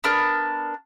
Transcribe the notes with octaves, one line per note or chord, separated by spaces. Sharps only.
B3 D4 A#4 F6